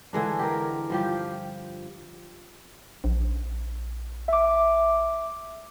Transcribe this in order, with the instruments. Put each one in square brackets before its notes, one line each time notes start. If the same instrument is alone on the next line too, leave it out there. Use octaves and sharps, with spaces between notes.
[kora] D3 E3 G#3 D4
G4 A#4
G2 F3 G4
[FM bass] A#1
[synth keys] E5 D6